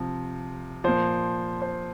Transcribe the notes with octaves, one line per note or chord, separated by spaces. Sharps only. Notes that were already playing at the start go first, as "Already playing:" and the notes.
Already playing: C3 F3
A#2 F3 C5
C5